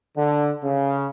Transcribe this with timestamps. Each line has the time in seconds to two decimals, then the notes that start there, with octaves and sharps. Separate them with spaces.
0.16 D3
0.64 C#3